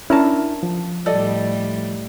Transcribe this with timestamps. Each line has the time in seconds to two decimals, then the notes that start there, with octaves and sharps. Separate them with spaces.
0.10 C#4 D4 E4 A#4 A5 A#5
0.63 F3
1.06 A2 G3 A4 D5 D#5